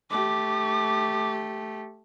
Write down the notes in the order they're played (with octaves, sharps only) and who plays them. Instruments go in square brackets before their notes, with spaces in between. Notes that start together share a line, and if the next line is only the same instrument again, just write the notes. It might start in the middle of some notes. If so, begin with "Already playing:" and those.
[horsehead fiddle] A3 G4 [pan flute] D6